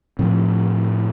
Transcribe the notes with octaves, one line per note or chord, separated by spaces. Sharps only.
A2 F3 C4